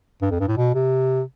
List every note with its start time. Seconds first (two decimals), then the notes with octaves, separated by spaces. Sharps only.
0.22 G2
0.31 F2
0.40 G2
0.48 A2
0.57 B2
0.74 C3